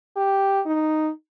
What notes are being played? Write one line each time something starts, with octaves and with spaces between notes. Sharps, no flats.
G4
D#4